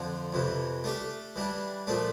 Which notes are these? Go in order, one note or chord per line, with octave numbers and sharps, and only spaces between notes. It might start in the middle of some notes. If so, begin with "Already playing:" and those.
Already playing: F2 D3 F3
F2 C3 E3
A3 D4 G4
E3 G3 D4
A#2 F3 A3 D4